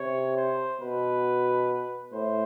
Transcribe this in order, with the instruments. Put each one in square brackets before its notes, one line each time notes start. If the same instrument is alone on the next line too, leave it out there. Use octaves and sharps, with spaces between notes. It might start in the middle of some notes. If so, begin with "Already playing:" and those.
Already playing: [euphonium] C3 [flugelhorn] C#5
[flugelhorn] C5
[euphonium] B2 [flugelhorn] B4
[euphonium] A2 [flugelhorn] C5